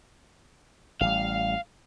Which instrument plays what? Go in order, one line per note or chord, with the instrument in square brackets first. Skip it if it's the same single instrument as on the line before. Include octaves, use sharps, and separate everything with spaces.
[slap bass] A1 G3 [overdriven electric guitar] F5